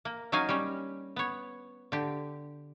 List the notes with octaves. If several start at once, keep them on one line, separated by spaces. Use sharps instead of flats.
A#3
F#3 C#4 D#4 F5 G#5
G3 C#4
B3 C#5
D3 G4